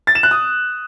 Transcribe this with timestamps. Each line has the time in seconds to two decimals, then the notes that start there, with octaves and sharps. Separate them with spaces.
0.07 A6
0.15 E7
0.23 F#6
0.31 D#6